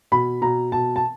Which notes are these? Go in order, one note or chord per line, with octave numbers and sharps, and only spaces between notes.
B2 B5
B2 A#5
B2 A5
A5